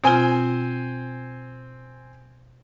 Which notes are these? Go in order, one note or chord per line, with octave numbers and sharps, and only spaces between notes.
B2 C4 F4 C5 G#5